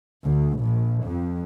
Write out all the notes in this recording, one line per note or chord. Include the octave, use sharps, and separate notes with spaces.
D2
A#1
F2